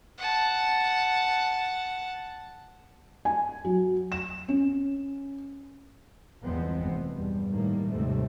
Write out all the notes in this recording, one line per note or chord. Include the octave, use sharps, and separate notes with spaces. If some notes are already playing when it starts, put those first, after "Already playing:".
F#5 A5
G#5
F#3
E7
C#4
G1 E2 F3 G#3 B3 C4
F1
E2 G2 B2 G3
A2 D#3 G3 A#3
D#2 G#2 C3 G3 A3 C4